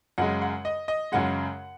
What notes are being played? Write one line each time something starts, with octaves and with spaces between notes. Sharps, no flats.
F#2 C#3 G#3 F#5
F#5
D#5
D#5
F#2 C#3 G#3 F#5